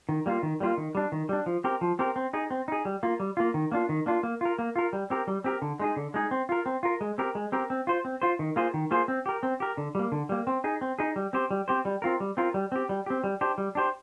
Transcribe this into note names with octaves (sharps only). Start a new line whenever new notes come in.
D#3
G3 A#3 F4
D#3
G3 A#3 F4
D#3
G3 D4
D#3
G3 D4
F3
C4 G4 A#4
F3
C4 G4 A#4
C4
D#4 G#4
C4
D#4 G#4
G3
A#3 F4
G3
A#3 F4
D#3
A#3 D4 F4
D#3
A#3 D4 F4
A#3
F4 A#4
A#3
F4 A#4
G3
C4 G4 A#4
G3
C4 G4 A#4
D3
G#3 D#4 G#4
D3
G#3 D#4 G#4
C4
F4 A#4
C4
F4 A#4
G#3
C4 G4 A#4
G#3
C4 G4 A#4
C4
F4 C5
C4
F4 C5
D#3
A#3 F4 G#4 C5
D#3
A#3 F4 G#4 C5
C4
G4 A#4
C4
G4 A#4
D3
G3 A#3
D3
G3 A#3
C4
D#4 G#4
C4
D#4 G#4
G3
C4 G4 C5
G3
C4 G4 C5
G3
C4 F4 A#4
G3
C4 F4 A#4
G3
C4 G4
G3
C4 G4
G3
D4 G4 C5
G3
D4 G4 C5